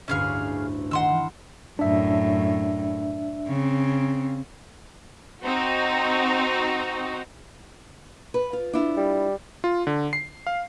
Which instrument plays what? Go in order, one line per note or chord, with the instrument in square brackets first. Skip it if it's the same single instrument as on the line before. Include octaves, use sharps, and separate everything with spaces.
[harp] A1 D2 G2 [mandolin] C#4 G#4 F5
[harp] D#3 A#5 C7 [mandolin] F#5 C6 E6
[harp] E3 F6
[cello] F#2 A2 [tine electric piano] D4 E5
[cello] C#3 C4
[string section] C4 D#4 F#4
[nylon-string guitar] B4
F4
D4 E4 F4
[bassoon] G3
[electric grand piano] F4
D3
C7
F5